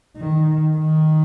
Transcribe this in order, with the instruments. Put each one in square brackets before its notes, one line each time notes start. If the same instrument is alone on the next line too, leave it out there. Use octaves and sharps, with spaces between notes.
[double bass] D#3
D#3